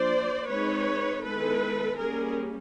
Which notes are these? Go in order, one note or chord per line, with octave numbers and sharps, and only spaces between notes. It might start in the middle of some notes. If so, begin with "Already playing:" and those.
Already playing: F3 A#3 D4 C5 D5
G#3 C4 D#4 B4 C#5
D#3 G#3 B3 E4 A4 B4
G3 A#3 C#4 G#4 A#4